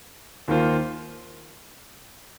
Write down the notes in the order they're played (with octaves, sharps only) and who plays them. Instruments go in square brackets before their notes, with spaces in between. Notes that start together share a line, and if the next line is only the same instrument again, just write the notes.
[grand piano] D#2 D#3 A#3 F4 C5